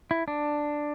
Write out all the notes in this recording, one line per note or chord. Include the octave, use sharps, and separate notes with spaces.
E4
D4